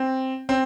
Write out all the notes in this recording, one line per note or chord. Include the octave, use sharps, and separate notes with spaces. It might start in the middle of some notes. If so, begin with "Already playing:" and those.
Already playing: C4
C4